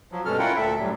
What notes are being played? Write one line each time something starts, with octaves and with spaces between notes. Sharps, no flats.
F3 F#3
G2 B2 G#3 C#4 A4 F6
C#4 E4 F4 A#4 F#5 G5
D2 A#2 A4 E5
F#2 A2 F#3 G3